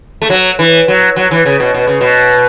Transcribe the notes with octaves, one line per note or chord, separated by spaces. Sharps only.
A3
F#3
E3
F#3
F#3
E3
C#3
B2
B2
C#3
B2